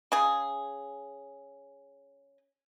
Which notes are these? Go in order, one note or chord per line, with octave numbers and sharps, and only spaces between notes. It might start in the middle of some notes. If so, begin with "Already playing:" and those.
C#3 G#4